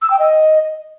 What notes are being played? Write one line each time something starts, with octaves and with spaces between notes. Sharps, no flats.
E6
G5
D#5